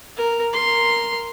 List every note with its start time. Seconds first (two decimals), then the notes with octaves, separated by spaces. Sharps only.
0.17 A#4
0.53 A#4 C6